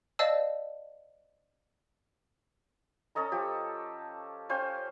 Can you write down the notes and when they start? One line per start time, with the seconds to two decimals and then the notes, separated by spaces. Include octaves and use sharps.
0.19 C5 D5 D#5 F5 A5 E6
3.15 C#4 A4 D#5 A#5
3.32 F3 G4
4.49 C#4 C5 F5 G5